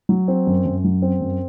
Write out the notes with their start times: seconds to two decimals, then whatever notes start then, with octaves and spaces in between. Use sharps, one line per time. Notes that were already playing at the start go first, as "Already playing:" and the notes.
0.09 F#3
0.28 C4
0.47 F#2
0.65 F#2
0.84 F#3
1.02 C4
1.21 F#2